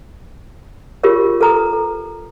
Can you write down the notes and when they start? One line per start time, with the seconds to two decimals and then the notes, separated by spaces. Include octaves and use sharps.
1.03 F4 G4 G#4 A#4 C#5
1.41 A4 B4 A#5 D#6
1.73 A4